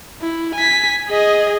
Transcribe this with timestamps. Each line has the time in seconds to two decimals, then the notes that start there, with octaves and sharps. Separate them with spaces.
0.21 E4
0.55 G#5 B6
1.08 G#4 D#5